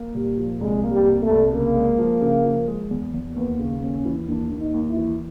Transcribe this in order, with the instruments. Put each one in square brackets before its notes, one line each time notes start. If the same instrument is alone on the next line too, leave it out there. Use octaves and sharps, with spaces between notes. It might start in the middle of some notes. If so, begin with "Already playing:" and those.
Already playing: [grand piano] A#3
[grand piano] A#2 [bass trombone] G3
[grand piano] F3
[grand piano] C2 [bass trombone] G#3
[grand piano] A#3
[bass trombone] G3
[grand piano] C2
[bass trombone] A3
[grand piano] C2
[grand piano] C#3 [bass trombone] A#3
[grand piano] G#3
F3
C#3
F3
G#3
E2
E2
[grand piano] D#2 [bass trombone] B3
[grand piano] C#3
[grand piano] D#2 [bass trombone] C#4
[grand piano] E3
[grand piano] D#2 [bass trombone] D4
[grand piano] D#2
[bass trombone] D#4
[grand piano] D#2
[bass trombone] E4
[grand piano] E3